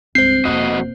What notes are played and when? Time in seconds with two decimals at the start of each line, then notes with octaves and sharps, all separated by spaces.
0.15 C#2 G2 C4 C5 C7
0.45 E1 F2 A#3 F#4 D#5